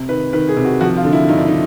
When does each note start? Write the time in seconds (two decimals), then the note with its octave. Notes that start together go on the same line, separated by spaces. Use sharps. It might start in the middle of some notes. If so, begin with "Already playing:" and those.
Already playing: C3
0.09 D#3 B4
0.33 D#3 B4
0.49 G#4
0.56 C3
0.65 F#4
0.81 F3 F#4
0.97 F4
1.04 D3
1.13 E4
1.29 G2 D#4
1.38 D4
1.47 D#4